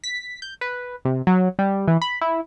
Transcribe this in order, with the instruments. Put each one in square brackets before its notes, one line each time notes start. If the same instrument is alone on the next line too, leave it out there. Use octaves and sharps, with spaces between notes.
[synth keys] B6
G6
B4
C3
F#3
G3
E3
B5
E4